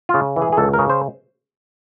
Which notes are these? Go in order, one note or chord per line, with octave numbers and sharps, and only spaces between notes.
F4
C#3
E3
G#4
G#4
C#2 A4
A#4
C#3
C5